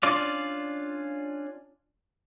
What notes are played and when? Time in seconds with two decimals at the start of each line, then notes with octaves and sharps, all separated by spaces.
0.03 C#4 D4 F4 D5 F5